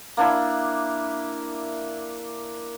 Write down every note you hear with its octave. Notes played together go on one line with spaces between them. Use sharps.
A#3 D4 E4